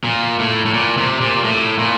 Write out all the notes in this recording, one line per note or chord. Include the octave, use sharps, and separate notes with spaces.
A#2
A2
A2
A#2
C3
A#2
A2
A#2